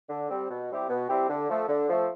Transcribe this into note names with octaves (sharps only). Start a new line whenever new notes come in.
D3
G3 C4
B2
G3 C4 E4 G4
B2
G3 C4 E4 G4
D3
F3 A3
D3
F3 A3